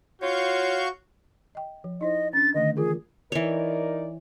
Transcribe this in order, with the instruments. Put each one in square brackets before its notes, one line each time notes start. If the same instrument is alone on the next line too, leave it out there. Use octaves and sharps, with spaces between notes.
[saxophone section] F4 C#5 [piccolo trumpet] F#4 [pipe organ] F5 C#6 G6
[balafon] D#5 G5
F3
[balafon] D#4 E4 C5 [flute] D#5
[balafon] C#4 D4 [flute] A6
[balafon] D3 D#3 A3 [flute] D#5
[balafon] E3 F4 A#4 [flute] G#4
[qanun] E3 C#5 [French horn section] D#4 A#4 D5